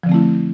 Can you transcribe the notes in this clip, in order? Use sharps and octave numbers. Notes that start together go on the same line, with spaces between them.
D3 F3 A3 C4 E4